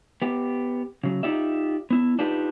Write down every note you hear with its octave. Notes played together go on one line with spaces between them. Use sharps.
B3 G4
C#3 F#3
D#4 F4 G4 D5 E5
B3 E4
D4 D#4 F4 G4 B4